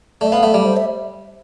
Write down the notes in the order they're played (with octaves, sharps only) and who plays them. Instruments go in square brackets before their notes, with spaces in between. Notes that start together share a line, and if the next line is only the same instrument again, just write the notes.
[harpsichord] A3 [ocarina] D5
[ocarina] E5
[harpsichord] B3 [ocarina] F5
[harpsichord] A3 [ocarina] E5
[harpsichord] G3 [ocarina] D5
[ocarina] C5
E5